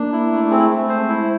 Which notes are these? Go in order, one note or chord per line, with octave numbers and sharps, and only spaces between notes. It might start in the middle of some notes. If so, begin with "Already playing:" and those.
Already playing: A#3 D4
E4
A3
G#3 C4
A3
C5
E4